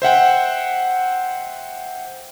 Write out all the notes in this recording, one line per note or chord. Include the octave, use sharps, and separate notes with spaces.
C5 E5 F#5 G5